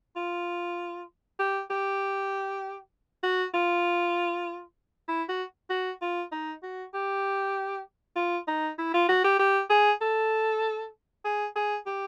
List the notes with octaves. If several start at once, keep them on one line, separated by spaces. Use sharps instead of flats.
F4
G4
G4
F#4
F4
E4
F#4
F#4
F4
D#4
F#4
G4
F4
D#4
E4
F4
F#4
G4
G4
G#4
A4
G#4
G#4
G4